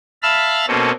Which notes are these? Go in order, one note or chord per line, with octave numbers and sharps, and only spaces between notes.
E5 F5 A5 B5 E6 F6
B2 A#3 C4 C#4 A4